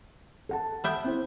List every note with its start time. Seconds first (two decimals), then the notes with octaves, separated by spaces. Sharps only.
0.49 A4 F#5 A5
0.84 B3 E5 G5
1.04 C4 E4 C5